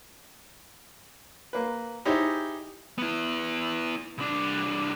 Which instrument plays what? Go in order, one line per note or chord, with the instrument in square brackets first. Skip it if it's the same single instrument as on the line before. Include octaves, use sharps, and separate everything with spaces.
[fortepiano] A#3 B4
D#4 E4 G4 G#4 C5 C#5
[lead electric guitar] B3 E4
C2 D4